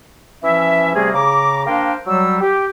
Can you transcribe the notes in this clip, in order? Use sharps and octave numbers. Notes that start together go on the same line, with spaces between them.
E3 F3 C#4 E5
C3 G3 A3 A#3 G#4
C#3 A#5 D6
A#3 D4 A#4 C5 F5 G5
F#3 G3 E6
G4